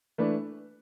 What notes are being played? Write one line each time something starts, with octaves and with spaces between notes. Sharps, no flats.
E3 A3 D4 B4